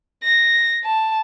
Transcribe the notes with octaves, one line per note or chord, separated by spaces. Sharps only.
A#6
A5